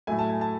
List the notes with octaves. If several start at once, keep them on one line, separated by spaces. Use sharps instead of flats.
A2 F#3 A3 G#5
A5
G#5
A5